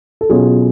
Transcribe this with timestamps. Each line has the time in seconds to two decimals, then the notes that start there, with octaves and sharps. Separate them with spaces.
0.21 A4
0.30 B2 F#3 C#4 F4 G#4